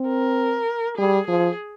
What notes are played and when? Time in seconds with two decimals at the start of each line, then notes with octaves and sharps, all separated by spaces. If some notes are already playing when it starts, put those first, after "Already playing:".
Already playing: C4
0.08 A#4
0.98 G3 G#4
1.28 F3 G#4